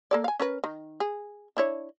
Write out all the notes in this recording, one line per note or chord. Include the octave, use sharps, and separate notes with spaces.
A#3 A4 D5
F5 G#5
C#4 A#4 B4
D#3
G#4
D4 E4 C#5